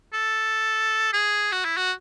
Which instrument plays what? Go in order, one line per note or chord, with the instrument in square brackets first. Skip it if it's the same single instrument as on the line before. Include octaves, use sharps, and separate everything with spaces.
[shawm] A4
G#4
F#4
E4
F#4